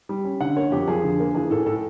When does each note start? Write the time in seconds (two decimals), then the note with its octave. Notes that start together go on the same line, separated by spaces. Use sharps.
0.09 G3
0.25 C#4
0.40 D3 F#5
0.57 A#3 C#5
0.72 F2 G4
0.88 F3 G#4
1.03 D3
1.20 A#3
1.35 E3 G#4
1.51 A2 A4
1.66 A2 A4